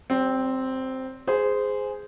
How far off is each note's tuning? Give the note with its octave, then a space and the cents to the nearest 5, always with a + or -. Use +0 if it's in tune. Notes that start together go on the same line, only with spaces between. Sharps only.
G3 -45 C4 +0
G#4 +0 C5 -15